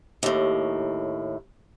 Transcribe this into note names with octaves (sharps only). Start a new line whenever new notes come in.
D#2 A2